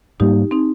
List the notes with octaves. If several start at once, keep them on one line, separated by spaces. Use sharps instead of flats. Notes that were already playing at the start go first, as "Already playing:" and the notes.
G#2 G3 A#3 D#4 G4
C4 D#4